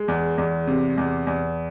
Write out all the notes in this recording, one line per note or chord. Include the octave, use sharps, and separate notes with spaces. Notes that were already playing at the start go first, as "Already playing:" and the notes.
Already playing: G#3
E2
E2
C3
E2
E2